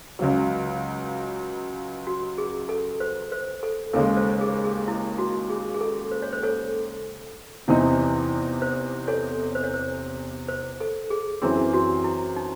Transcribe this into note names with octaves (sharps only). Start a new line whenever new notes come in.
C#2 C#3 F#3
F#4
G#4
A4
C5
C5
A4
D#2 C#3 G#3 A4
C5
G#4
G#4
E4
F#4
G#4
G#4
A4
C5
C#5
C5
A4 C#5
E2 C3 E3 C4 D#4
C5
A4 C#5
C5
C#5
C5
C5
A4
G#4
F#2 E3 C4 G#4
F#4
E4
D#4